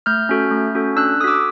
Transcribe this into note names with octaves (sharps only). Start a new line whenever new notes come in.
A3 F6 G6
C#4 F#4 A4
A3
C#4 F#4 A4
D4 E6 F#6
F#4 A4 D6 D#6 E6